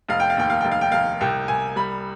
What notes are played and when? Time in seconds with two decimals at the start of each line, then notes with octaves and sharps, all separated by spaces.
0.09 F1 F5
0.20 G5
0.30 F5
0.37 D#2 G5
0.50 F5
0.61 F1 G5
0.71 F5
0.81 G5
0.92 F1 F5
1.21 C2 G5
1.48 C2 G#5
1.76 G3 B5